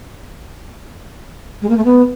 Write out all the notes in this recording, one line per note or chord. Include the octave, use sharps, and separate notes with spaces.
G#3
A#3
A3
B3